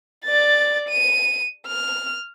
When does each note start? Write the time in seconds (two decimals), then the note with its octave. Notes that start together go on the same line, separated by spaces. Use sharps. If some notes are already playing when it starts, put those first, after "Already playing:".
0.25 D5 A6
0.89 D#7
1.67 F6